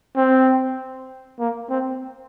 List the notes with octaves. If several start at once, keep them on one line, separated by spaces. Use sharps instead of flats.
C4
A#3
C4